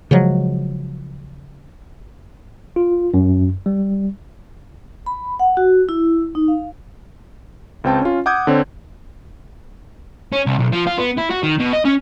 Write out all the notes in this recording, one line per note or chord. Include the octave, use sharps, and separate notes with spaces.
C#3 F3 F#3 G#3
F4
F#2
G3
B5
F#5
F#4
E4
D#4
F5
C#2 C4 G5 A5
C#4 F4
F#5 D6 D#6 G6 G#6
D3 C4 C#5
C#4
C2
B1
F3
F4
B3
E4
F#4
D#3
B2
D#5
C#4